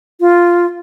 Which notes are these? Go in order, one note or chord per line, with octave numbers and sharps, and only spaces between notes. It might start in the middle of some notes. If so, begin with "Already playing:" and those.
F4